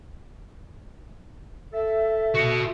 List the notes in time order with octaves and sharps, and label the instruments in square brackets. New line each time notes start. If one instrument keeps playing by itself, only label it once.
[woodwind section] A4 E5
[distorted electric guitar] F#4 D#5